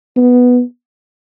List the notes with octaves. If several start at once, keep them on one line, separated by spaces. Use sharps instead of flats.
B3